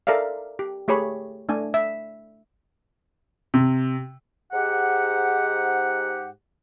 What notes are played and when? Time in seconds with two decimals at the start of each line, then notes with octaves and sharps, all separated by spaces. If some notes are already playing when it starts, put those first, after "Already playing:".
0.07 A4 A#4 D5 E5 F5
0.59 G4
0.88 A3 G4 G#4 C#5 B5
1.49 A3 D4 G#5
1.74 E5
3.54 C3
4.52 G#2 G4 F#5